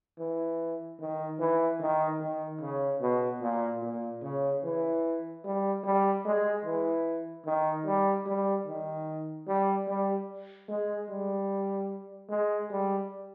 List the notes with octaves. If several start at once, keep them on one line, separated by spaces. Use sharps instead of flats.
E3
D#3
E3
D#3
D#3
C#3
B2
A#2
A#2
C#3
E3
G3
G3
G#3
E3
D#3
G3
G3
D#3
G3
G3
G#3
G3
G#3
G3